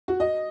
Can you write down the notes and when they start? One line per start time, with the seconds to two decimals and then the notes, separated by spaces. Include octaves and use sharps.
0.08 F#4
0.20 D#5